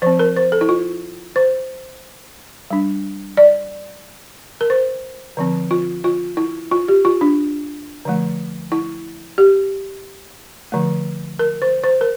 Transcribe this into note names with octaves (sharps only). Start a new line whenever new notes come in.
F3 C4 C5
A#4
C5
A4
E4
F4
C5
G3 D4
D5
A#4
C5
D3 F3 C4
F4
F4
E4
F4
G4
F4
D4
D3 F3 A3
E4
G4
D3 F3 A3
A#4
C5
C5
A#4